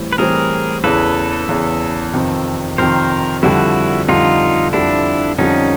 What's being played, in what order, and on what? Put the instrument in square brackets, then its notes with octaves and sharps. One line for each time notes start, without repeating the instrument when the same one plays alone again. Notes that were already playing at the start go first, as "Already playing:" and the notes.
Already playing: [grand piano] A2 E3 G3 C4
[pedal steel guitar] B4
[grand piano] A2 E3 G3 C4 [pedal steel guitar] G#4 A#4
[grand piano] E2 C#3 E3 [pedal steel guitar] A4 B4
[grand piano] E2 C#3 E3
F2 C3 D#3
[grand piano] F2 C3 D#3 [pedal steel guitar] A#4 C5
[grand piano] F2 D3 G3 [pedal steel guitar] E4 F#4
[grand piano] F2 D3 G3 [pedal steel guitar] D#4 F4
[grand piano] F2 D3 G3 [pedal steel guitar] D4 E4
[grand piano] F2 D3 G3 [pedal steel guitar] C#4 D#4